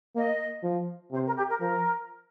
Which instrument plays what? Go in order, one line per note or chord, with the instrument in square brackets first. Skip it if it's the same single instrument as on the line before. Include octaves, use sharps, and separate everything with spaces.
[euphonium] A#3 [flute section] D#5
[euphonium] F3
[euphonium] C3 [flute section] C5
[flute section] A#4
G4
A#4
[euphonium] F3 [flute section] A#4